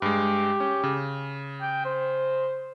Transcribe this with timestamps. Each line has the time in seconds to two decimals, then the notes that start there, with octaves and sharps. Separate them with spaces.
0.02 G2 G#3 G4
0.60 C#4
0.83 C#3
1.62 G5
1.85 C5